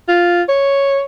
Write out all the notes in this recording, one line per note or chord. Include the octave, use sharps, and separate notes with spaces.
F4
C#5